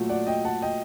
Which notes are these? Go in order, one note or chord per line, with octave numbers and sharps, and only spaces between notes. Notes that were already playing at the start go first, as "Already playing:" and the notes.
Already playing: A#2 F#3 A3
D5 F#5
D#5 G5
F#5 A5
D#5 G5